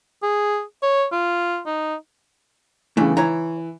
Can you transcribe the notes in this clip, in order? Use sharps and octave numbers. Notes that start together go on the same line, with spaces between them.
G#4
C#5
F4
D#4
E2 G2 C#3 E3 A3
E3 C#5 A#5